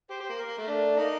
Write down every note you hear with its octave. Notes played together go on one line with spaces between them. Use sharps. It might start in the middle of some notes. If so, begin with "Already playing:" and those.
G4 C5
G4 C5
A#3
A#4
A#3
A3
D4
A#3 D#4